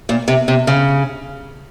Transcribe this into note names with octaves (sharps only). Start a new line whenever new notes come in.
A#2
C3
C3
C#3